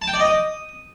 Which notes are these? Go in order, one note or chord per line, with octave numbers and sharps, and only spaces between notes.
A5
G5
D5
D#5
D#6